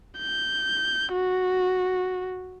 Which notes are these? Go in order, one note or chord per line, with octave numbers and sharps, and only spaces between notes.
G6
F#4